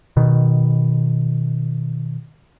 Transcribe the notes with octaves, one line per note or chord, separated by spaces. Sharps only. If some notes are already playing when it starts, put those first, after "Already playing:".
B2 D#3